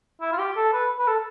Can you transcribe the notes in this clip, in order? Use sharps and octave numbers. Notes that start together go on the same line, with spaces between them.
E4
F4
G4
A4
B4
B4
A4